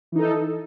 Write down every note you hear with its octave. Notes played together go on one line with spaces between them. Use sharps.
E3 D#4 A4